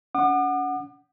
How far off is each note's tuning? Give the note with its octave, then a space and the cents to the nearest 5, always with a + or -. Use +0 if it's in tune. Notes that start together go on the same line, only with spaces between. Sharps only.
C#4 +40 F#5 +0 D6 +45